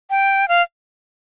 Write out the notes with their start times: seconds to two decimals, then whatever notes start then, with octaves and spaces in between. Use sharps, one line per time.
0.10 G5
0.48 F5